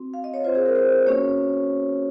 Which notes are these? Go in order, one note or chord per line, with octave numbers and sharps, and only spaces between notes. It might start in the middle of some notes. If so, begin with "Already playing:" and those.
Already playing: C4 F#4
F5
D#5
C#5
C4 F4 C5
G#4
A#4
C5
A#3 C#4 F#4 C#5